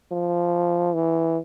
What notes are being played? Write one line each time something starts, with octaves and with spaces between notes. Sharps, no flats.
F3
E3